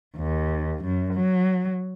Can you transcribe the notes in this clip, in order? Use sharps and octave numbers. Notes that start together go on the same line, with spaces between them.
D#2
F#2
F#3